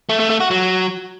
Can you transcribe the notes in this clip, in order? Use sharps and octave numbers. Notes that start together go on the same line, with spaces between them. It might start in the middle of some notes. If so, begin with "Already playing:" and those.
A3
A3
A3
F#4
F#3